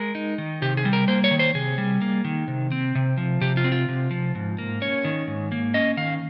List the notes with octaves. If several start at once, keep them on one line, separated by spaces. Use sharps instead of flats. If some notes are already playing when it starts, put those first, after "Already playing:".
Already playing: G#3 A#4
D#4
D#3
C3 G4
G#4
G3
A#4
A#3 C5
C#5
D#3
C5
C3 G#4
G3
A#3
D#3
C3
C4
C3
F3
C3 G4
F4
C4
F4
C3
F3
G#2
A#3
C#4 C#5
D#3
G#2
A#3
C#4 D#5
D#3 F5